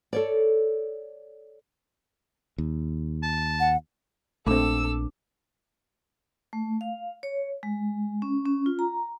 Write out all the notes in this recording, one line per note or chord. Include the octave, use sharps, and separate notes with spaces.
A4 C#5 D5
D#2
A5
F#5
A#1 A3 C4 D4 A4 D6 E6
A3
F5
C#5
G#3
C#4
C#4
F4
A#5